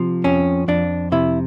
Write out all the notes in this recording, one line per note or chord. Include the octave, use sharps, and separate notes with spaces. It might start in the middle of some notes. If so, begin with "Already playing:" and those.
Already playing: C3 F3
F2 C#4
F2 D4
C3 E4